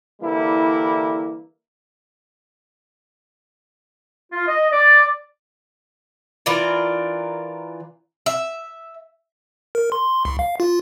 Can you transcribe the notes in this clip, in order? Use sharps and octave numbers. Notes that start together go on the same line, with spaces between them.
D3 E3 G3 A#3 E4
F4
D#5
D5
E3 D4 F4 A#4
E5
A#4
C6
C2
F5
F4